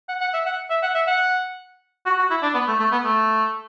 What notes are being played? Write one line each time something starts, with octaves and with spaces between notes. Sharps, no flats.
F#5
F#5
E5
F#5
E5
F#5
E5
F#5
F#4
F#4
E4
D4
B3
A3
A3
B3
A3